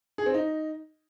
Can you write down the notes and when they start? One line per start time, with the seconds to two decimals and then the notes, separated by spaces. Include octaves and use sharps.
0.18 G#4
0.26 C4
0.34 D#4